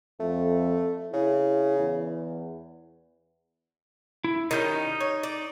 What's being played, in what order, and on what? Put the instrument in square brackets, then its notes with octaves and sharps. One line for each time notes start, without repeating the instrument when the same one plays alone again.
[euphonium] F2 [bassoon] A3
[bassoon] C#3 [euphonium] E4
[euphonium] E2
[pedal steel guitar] E4
[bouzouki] D#3 G3 C#4 [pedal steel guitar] D#4 G6
[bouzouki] C#5
D5